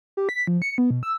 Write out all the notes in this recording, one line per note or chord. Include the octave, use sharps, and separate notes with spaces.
G4
B6
F3
C#7
B3
B2
E6